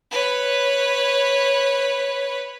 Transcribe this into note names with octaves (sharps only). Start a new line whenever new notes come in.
B4 C#5